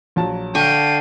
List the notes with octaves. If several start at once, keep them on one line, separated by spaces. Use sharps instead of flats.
A#1 F#3 A5
D3 F5 G5 C#6 D#7